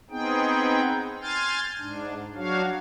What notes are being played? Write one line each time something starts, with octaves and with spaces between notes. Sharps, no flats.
B3 C4 D#4 G#4 G5
G#5 C6 F6 G6 A6
G#2 D4
F#3 D4 F#4 C#5 F5